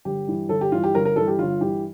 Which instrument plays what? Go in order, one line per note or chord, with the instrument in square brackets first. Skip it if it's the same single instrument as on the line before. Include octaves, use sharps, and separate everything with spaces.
[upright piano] G1 G4
G2 E3
G1 A4
G4
G2 E3 F4
G4
G1 A#4
A#4
G2 E3 A4
G4
G1 F4
G2 E3 G4